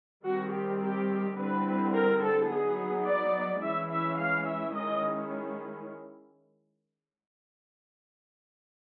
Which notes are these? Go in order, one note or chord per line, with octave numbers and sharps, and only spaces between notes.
D#3 G3 C4 F#4
G4
G4
D3 G3 C4 E4 B4
A#4
A4
F#3 B3 D#4 G#4
D5
E3 G#3 C#4 E4 E5
E5
F5
E5
D#3 G#3 C#4 E4 D#5